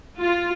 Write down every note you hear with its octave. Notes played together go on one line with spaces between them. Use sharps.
F4